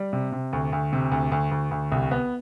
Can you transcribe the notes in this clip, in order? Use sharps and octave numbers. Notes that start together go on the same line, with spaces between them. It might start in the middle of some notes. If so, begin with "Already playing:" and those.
Already playing: G3
C3
C3
D2
D2
C3
D2
D2
D2
D2
C2
B3